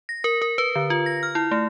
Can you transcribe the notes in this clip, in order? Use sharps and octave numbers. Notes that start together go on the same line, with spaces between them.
A#6
A#4
A#4
B4
D3
F4
A#6
F6
E4
A3